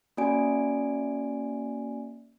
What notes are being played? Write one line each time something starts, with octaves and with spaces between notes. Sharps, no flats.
A#3 C#4 F#4 D5 G#5 D7